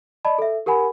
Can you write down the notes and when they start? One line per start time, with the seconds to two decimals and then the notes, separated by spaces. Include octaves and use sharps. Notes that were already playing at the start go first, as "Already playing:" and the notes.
0.25 D5 D#5 A5 B5
0.38 A4 E5
0.66 G4 A#4 F#5 G#5 B5